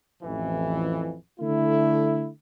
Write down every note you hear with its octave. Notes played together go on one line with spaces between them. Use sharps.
A1 F2 E3
D3 A3 E4